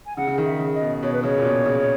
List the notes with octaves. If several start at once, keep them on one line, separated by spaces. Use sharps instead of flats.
G#5
C#3 F#5
C#3
D#3
E5
C#3
D#5
B2
B2 C#5
B4
C#3 C#5
A#2
B2
C#3